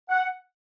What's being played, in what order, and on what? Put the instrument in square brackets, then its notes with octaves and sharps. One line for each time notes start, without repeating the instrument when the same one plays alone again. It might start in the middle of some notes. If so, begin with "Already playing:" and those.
[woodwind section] F#5